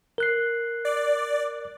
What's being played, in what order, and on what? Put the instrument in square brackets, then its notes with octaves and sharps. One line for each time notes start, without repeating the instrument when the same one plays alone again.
[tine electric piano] A#4 F#6 C7
[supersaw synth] D5